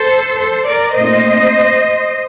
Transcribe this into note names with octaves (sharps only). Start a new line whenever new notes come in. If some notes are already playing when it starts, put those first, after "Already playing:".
Already playing: A4 C5
A4 C5
A#4 D5
A#2 A3 C4 D#4 C5 D#5